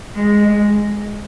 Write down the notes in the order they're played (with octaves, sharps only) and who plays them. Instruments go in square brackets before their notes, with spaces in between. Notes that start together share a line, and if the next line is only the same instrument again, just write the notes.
[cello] G#3